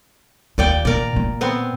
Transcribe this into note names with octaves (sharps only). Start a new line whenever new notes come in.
D#2 A#2 D5 G5
A#2 A#4 D5
A#2
B3 C4